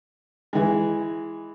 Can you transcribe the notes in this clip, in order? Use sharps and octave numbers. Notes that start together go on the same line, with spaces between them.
E3 G#3